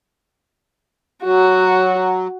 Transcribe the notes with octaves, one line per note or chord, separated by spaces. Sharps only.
F#3 F#4